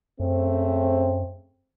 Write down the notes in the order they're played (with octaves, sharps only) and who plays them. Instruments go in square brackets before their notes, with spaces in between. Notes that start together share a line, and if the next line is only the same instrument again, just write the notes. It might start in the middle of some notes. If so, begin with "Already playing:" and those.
[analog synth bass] F#2 [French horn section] C#3 A3 C4